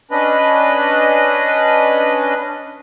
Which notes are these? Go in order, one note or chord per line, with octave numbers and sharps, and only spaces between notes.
C#4 D4 B4 D#5 B5